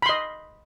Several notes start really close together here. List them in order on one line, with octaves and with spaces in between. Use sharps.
B5 C6 D#5